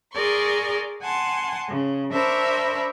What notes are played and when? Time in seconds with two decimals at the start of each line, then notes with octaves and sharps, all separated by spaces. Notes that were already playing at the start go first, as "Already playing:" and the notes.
0.12 G#4 A#4 D5 C6 C#6
1.01 F#5 G#5 A5 C6
1.68 C#3
2.12 D4 A#4 C5 E5 B5 C#6